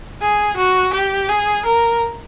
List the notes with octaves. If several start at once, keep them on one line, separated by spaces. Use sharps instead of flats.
G#4
F#4
G4
G#4
A#4